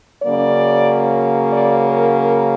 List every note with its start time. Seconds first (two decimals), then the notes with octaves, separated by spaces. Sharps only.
0.23 C#3 F#3 A#3 D5
1.52 D5
1.84 A#4
2.16 A#4